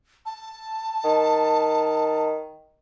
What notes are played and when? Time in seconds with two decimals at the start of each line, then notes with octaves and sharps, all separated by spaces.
0.26 A5
1.04 D#3